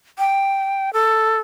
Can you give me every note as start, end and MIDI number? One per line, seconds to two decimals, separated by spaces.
0.18 0.93 79
0.93 1.40 69